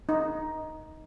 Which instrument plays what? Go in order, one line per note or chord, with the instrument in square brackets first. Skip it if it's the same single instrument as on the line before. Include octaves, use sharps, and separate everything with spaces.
[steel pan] D#4